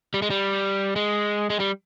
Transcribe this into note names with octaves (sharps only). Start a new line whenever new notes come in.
G3
G#3
G3
G#3
G#3
G3